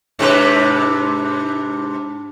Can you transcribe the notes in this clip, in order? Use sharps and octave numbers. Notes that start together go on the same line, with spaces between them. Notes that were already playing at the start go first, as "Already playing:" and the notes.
G#2 C3 D4 B4 A5 D6